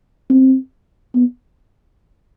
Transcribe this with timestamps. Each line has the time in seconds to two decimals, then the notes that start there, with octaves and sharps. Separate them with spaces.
0.30 C4
1.15 B3